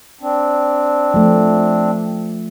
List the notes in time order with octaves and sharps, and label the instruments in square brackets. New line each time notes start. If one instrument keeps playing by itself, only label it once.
[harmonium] C4 D4
[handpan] F3 A3